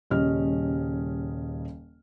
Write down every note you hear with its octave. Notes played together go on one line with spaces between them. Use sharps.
D#1 C#3 G3 C#4 D#5 F6